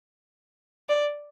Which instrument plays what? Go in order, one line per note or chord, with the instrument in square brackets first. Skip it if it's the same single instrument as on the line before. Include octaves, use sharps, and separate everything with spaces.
[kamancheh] D5